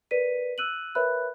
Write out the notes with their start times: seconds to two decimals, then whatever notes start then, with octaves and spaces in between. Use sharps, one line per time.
0.11 A#4 B4 D5 B6 D#7
0.58 E6 F#6 D#7 F#7
0.95 A#4 B4 C#5 E5 B5 F#6